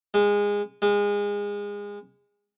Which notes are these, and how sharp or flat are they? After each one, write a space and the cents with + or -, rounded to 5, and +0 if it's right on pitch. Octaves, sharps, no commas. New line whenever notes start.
G#3 -20
G#3 -25